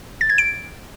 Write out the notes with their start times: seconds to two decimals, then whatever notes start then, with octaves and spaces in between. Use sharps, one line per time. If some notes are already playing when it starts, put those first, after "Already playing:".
0.21 A6
0.30 G#6
0.38 D7